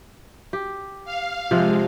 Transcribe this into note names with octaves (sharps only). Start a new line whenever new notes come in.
G4
F5
C3 F3 G#3